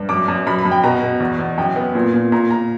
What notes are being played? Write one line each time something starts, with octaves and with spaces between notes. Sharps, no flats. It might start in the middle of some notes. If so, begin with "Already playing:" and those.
Already playing: G2
F#2 D6
F#2
F#2 B5
B5
F#2
G5
B2 A#5
B2
E2
E2
F#2 G5
B3
A#2
A#2
A#2 A#5
A#2 A#5